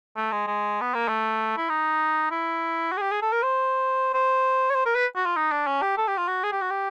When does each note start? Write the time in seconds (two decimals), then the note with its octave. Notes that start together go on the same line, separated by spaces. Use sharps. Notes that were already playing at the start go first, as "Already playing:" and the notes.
0.17 A3
0.32 G#3
0.47 G#3
0.81 B3
0.95 A#3
1.08 A3
1.58 E4
1.70 D#4
2.31 E4
2.92 F#4
2.97 G#4
3.01 G4
3.12 G#4
3.22 A4
3.32 A#4
3.43 C5
4.14 C5
4.70 C#5
4.75 C5
4.86 A#4
4.95 B4
5.16 F#4
5.26 F4
5.36 D#4
5.51 D4
5.67 C#4
5.82 G4
5.98 A4
6.08 G4
6.18 F4
6.28 F#4
6.44 G#4
6.52 G4
6.61 F#4
6.71 G4